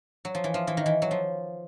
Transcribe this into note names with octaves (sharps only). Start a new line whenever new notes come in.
F#3
F3
E3
F3
E3
D#3
E3
F#3
F3